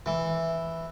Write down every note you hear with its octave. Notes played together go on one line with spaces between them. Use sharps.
E3